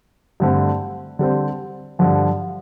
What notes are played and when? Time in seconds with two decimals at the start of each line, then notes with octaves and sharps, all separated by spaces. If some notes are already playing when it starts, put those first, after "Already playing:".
0.40 G2 D3 A3 C4
1.19 D3 G3 C4
1.99 G2 D3 F3